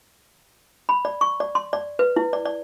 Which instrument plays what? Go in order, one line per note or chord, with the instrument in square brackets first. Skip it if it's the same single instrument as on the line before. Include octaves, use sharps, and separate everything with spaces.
[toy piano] B5
D5
C#6
D5
C6
D5
B4
E4
D5
D5